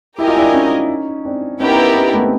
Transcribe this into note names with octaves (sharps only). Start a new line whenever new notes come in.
E4 G4 A#4 D#5 G#5
F4
D4 E4
C#4 D#4
C4 D4
B3 C#4 D#4 E4 G4 A#4
C#4 D#4
A3 B3
C4